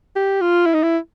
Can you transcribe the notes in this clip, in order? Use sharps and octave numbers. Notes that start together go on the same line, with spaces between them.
G4
F4
E4
D#4
E4